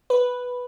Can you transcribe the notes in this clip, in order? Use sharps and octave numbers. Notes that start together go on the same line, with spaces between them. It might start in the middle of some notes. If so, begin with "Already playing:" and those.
B4